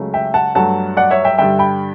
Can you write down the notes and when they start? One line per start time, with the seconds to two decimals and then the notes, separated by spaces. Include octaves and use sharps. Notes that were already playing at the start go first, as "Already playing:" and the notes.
Already playing: C#2 C#3 F#3 A3
0.14 E5 G5
0.34 F#5 A5
0.55 G2 F#3 A3 F#5 A5
0.97 D5 F#5
1.10 C#5 E5
1.24 E5 G5
1.38 G2 D3 G3 E5 G5
1.59 G5 B5